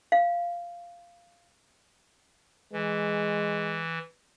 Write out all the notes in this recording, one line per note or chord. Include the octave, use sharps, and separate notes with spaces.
F5
E3 G#3